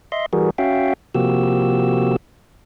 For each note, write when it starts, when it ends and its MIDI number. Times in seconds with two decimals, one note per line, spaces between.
0.12 0.26 75
0.12 0.26 76
0.12 0.26 84
0.33 0.50 52
0.33 0.50 55
0.33 0.50 66
0.33 0.50 68
0.33 0.50 70
0.58 0.93 61
0.58 0.93 66
0.58 0.93 76
0.58 0.93 77
0.58 0.93 79
1.15 2.16 48
1.15 2.16 53
1.15 2.16 58
1.15 2.16 66
1.15 2.16 67
1.15 2.16 88